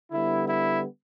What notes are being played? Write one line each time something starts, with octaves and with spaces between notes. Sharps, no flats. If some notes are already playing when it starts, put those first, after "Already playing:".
D3 G3 B3 E4
E4